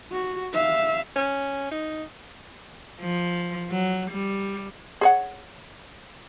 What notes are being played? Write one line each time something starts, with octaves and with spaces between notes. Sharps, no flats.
F#4
E5 F5
C#4
D#4
F3
F#3
G3
G#4 C#5 F#5